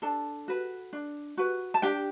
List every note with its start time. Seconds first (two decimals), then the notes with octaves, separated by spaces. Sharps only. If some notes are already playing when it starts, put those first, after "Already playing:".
0.02 D4 A4 A5
0.48 F#4 B4
0.93 D4
1.37 F#4 B4
1.74 A5
1.82 D4 G4 G5